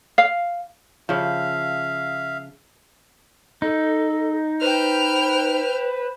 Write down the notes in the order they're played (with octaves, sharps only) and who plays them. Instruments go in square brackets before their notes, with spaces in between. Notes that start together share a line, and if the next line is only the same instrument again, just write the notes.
[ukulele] F5
[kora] C#3 F3 [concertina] E5 F5
[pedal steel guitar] D#4 [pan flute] A4
[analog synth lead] B4 [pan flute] C5 [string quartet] G5 F6